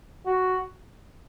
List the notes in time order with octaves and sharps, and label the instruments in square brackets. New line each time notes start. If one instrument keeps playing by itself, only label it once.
[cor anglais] F#4